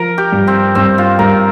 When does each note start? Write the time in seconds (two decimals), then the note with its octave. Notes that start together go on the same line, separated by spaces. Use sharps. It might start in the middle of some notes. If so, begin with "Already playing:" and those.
Already playing: F3 A#4
0.18 G4
0.32 G2
0.47 C4
0.75 G2 C4
0.98 F4
1.19 G2 A#4